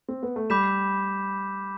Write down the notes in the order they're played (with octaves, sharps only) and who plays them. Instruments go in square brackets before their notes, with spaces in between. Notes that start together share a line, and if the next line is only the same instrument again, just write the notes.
[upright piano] C4
B3
A3
[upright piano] G3 [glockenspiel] B5 D6 G6 B6 E7